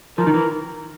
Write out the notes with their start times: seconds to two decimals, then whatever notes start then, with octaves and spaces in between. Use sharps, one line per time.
0.18 F3 A#4
0.27 D#3
0.34 E3